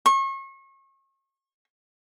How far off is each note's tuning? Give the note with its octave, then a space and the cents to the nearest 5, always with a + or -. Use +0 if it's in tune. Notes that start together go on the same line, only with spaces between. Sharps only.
C#6 -35